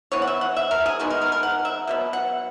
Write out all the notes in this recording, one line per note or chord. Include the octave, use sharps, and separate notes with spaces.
E3 B3 C#5
F#5
E5
F#5
E5
A#4
G#4
D#3 G#3 B3 F#4
A#4
A#4
A#4
F#5
E5
B2 F#3 B3
F#5